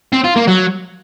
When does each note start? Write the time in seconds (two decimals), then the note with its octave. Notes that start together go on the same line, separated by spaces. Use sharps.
0.12 C4
0.24 F4
0.36 A#3
0.48 F#3